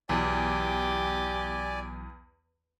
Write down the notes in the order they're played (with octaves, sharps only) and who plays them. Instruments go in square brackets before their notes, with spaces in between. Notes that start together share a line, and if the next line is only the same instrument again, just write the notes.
[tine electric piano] B1 E3 F#3 [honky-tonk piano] E2 [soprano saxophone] G4 [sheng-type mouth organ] D5 G#5